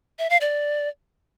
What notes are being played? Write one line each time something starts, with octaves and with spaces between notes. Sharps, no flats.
E5
F5
D5